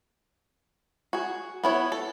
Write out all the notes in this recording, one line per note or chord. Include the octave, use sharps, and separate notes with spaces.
F#4 G#4
B3 E4 C#5
A4